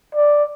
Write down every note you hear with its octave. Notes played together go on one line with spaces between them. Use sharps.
D5